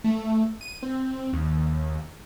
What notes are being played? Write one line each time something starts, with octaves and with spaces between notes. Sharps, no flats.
A3
D#7
C4
D#2